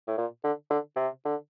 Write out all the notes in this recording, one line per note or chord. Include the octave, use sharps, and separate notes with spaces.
A2
A#2
D3
D3
C3
D3